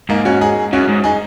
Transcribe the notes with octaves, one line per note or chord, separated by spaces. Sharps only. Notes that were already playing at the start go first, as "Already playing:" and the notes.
G#2 A#3 D#4
C#4 F#4
D#4 G#4
F#2 C#4 F#4
G#2
D#4 G#4